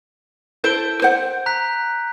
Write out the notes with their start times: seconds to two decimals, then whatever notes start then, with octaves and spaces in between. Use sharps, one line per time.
0.64 E4 A4 C5 G6 D7 G7
1.02 C5 F#5
1.46 A#5 F#6 B6